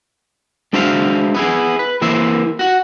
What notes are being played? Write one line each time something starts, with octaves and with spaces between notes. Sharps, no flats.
G#3 D4 F#4 C5 E5 F5
B3 E4 G#4
B4
E3 A#3 E4 C5 E5
F#4 F#5